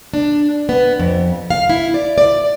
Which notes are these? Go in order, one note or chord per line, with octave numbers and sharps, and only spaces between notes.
D4
B3
F2
F5
E4
D5
D5